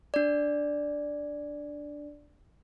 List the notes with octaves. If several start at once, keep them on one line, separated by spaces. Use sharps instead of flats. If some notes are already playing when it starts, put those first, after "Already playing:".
D4 D5